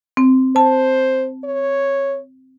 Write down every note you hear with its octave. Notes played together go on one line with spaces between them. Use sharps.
C4
C5 A5
C#5